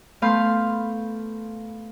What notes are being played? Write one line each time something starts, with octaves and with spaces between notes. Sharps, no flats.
A3 B3 F5 B5 C6 G6